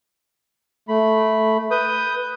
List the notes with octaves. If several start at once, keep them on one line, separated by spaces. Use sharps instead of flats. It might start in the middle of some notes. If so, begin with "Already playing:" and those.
A3 B5
B4 D#6 G6